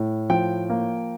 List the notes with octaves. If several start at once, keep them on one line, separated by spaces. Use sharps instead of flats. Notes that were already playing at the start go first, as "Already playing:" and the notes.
Already playing: A2
F3 G5
A#3